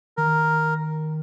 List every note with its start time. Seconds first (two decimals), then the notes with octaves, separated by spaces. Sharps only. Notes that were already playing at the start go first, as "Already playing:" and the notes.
0.17 D#3 A#4